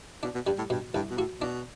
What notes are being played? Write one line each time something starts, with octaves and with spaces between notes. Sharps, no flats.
B2 D4
B2
G2 G3
A2
G2 B2
C2 G2
B2
A2 F#4
B2 D4